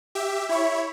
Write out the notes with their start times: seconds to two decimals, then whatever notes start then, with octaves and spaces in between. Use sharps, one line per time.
0.15 G4 E5
0.49 E4 C#5 E5